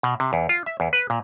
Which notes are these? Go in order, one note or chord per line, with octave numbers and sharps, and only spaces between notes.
B2
C3
E2
F4
E5
E2
B4
A#2